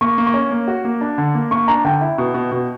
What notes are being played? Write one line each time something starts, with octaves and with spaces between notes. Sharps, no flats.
A#3 C#6
A#3
C#6
C#4
A#3
F#4
A#3
D4
D3
A#3
A#3 C#6
D4 A#5
D3 G5
E4
B2
B2
B2